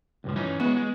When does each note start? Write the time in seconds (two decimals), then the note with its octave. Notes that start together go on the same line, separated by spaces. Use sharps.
0.24 C#2 G2 F3
0.36 E3 C#4 D#4
0.60 G#3 B3 F#4
0.77 G#3